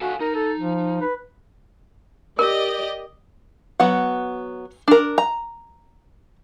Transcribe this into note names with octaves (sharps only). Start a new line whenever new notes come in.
F#4 A4 F5 G#5
D#4 A#4
A4
F3
B4
G4 A#4 D5 D#5
F#3 B3 F#5
D4 A#4
A#5